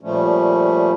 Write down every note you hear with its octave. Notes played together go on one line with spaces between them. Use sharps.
A#2 F3 G3 A3 C#4